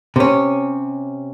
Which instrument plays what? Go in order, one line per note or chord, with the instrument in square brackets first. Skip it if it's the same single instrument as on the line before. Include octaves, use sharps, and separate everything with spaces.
[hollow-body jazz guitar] C3 C#4